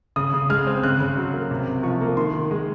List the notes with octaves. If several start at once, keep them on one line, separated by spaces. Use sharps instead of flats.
C#3 D#6
C#3
G#3 F6
C4
C#3 F#6
C#3
F#3
A#3
C3
C3
F3 C#6
A#3
D#3 C6
D#3
G#3